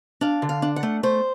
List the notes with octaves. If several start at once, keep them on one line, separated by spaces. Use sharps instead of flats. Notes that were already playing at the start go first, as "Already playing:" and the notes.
D4 F5
D3
F5
D4
F#5
A3
A3 C5